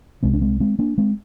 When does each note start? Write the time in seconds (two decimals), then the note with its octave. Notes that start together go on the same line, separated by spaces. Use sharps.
0.23 C2 C3 G#3 C4
0.34 D4
0.41 G#3 C4
0.60 G#3 C4
0.79 A#3 D4
0.98 G#3 C4